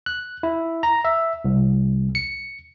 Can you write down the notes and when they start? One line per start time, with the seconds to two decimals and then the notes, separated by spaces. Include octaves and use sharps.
0.06 F#6
0.43 E4
0.83 A#5
1.05 E5
1.45 C2
2.15 C#7